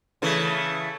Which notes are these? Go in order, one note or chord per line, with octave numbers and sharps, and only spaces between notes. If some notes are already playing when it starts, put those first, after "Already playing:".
C#3 E3 A3